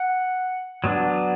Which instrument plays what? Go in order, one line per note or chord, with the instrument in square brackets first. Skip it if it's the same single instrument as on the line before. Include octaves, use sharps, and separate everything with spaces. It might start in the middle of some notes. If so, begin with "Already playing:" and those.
Already playing: [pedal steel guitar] F#5
F#3 B3 D4